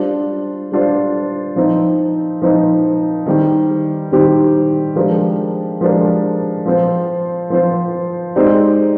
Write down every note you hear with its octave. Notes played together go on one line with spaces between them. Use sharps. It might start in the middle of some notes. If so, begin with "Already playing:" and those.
Already playing: G3 D4 F4 C5
G3 D4 F4 C5
F3 C4 D#4
F3 C4 D#4
D#3 G3 C4 G4
D#3 G3 C4 G4
F3 G#3 D4 G4 A#4
F3 G#3 D4 G4 A#4
F3 C4 F4 C5
F3 C4 F4 C5
G#3 C4 D#4 G4 D5